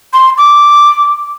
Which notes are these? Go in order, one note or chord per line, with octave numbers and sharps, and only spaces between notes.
C6
D6